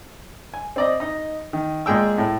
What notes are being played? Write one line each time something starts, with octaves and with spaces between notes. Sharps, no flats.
G#5
C4 D5 D#5
D#4 D#5
D#3
A#2 G#3 G#4 G5 E6
A2